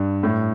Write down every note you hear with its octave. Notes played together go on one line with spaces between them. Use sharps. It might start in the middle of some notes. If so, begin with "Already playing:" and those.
Already playing: G2
A2